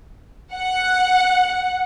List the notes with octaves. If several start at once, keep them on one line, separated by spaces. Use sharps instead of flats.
F#5